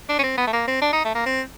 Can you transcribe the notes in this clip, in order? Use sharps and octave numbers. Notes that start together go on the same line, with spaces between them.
D4
C#4
C4
B3
A3
A#3
C4
D4
D#4
A3
A#3
C4